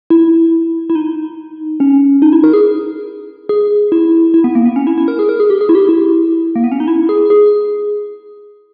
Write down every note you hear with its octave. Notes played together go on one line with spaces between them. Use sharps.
E4
E4
D#4
C#4
D#4
E4
A#4
G#4
G#4
E4
E4
B3
A#3
B3
C#4
E4
E4
A#4
G#4
A#4
G#4
G4
G#4
E4
G4
E4
A#3
B3
C#4
D#4
E4
G#4
G#4